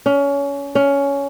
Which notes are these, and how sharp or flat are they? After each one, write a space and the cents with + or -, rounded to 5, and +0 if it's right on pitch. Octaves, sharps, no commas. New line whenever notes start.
C#4 +25
C#4 +15